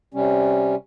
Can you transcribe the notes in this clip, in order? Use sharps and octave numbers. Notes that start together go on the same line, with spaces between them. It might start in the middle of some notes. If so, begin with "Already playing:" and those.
C3 G3 C#4